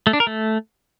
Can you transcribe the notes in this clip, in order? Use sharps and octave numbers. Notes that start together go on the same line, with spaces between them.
A3
D4
A#4
A3